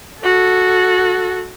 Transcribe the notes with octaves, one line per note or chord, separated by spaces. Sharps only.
F#4 A4